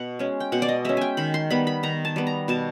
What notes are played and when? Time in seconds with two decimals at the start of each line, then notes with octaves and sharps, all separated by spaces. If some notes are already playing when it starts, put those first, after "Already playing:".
Already playing: B2 F#5
0.19 G#3 C#4
0.40 G5
0.52 B2 F#5
0.62 D5
0.69 D#5
0.85 G#3 C#4 E5
0.97 G5 G#5
1.17 D#3 B5
1.34 C6
1.50 G3 B3 B5
1.67 B5
1.83 D#3 A#5
2.05 A5
2.16 G3 B3
2.27 A#5
2.48 B2 A5